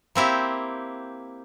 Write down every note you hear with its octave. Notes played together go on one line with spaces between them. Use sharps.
A#3 C4 E4 G4